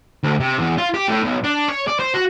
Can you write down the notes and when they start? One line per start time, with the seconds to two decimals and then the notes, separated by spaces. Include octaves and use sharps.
0.23 D2
0.40 C3
0.59 E2
0.78 F4
0.94 G4
1.08 A2
1.22 B1
1.44 D4
1.68 C#5
1.88 D5
2.00 C5
2.14 F#4